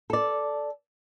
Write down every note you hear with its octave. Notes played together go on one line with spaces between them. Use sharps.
A4 D5